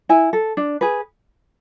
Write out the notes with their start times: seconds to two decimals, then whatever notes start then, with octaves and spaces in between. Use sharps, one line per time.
0.09 E4 G#5
0.33 A4
0.57 D4
0.81 G#4 B4